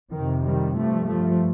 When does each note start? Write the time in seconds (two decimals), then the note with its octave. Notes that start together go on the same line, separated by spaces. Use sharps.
0.12 F2 C3 D#3
0.44 D#3 G3
0.75 G2 F3 A3
1.07 F3 A3